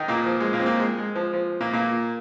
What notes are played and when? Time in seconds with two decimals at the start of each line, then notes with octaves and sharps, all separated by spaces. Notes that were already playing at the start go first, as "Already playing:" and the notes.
Already playing: D#3 D#4
0.08 A#2 A#3
0.26 F3
0.40 G#3
0.53 A#2 A#3
0.60 C4
0.66 A#2 A#3
0.80 G#3
0.98 G#3
1.15 F3
1.33 F3
1.61 A#2 A#3
1.73 A#2 A#3